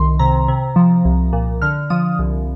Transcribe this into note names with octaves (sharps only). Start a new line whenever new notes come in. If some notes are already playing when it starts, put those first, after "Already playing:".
Already playing: C2 D#3 C6
C3 A#5
C3
F3
C2
A#2
D3 F6
F3 D#6
C2